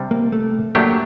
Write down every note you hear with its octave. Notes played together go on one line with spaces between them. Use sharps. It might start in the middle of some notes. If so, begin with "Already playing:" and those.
Already playing: C3 G3 D4
A#3
A3
F#3 A3 A#3 D4 G4